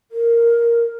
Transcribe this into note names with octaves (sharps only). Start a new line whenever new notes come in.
A#4